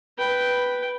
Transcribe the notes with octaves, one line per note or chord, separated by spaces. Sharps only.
B4 G5